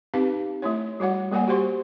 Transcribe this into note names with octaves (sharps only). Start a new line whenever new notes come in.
C4 D#4 G4 B4 F5 A5
A3 E4 C#5
G3 F#4 C#5 F#5
G3 A#3 A4 D5 F#5 G#5
F#4 G4 C5 C6 C#6